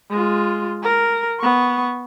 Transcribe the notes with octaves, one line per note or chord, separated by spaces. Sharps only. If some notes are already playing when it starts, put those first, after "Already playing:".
G#3 F4
A#4
B3 C#6